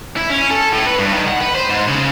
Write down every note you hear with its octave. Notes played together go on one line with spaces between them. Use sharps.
E4
C#4
A4
A2
B4
G2
D#3
F#5
B4
C5
G#2
C#3